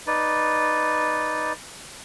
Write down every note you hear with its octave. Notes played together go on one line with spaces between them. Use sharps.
D#4 B4 D5